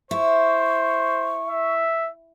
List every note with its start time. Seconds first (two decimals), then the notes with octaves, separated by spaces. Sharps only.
0.11 E4 C5 C#6
1.48 E5